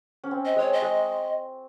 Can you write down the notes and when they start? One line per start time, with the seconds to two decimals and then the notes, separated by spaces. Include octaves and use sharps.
0.24 C#4
0.31 C4
0.45 D#5
0.56 G#3 C#5
0.73 D#5
0.82 G#3